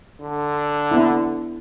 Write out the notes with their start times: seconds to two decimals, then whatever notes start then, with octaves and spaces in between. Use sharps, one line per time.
0.20 D3
0.91 B3 E4